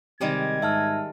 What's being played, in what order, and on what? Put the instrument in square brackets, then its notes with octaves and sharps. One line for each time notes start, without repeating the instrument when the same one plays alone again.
[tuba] C3 [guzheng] D#3 G3 G#3 [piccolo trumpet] G#6
[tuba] G#2 [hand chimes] E5 A5 F6